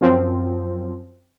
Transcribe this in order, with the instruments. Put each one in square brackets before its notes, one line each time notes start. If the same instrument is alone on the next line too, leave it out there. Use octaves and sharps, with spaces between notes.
[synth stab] F#2 F3 C4